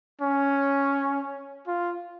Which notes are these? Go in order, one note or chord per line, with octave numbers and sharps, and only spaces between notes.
C#4
F4